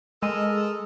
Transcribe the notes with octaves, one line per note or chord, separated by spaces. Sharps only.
G#3 A4 A#4 D#5